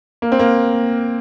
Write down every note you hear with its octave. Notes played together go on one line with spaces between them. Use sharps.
A#3
C4
A#3